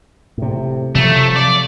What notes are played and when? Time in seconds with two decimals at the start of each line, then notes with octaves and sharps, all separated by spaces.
0.38 A2 C3
0.95 C3 F3 F#3 A3
1.36 D5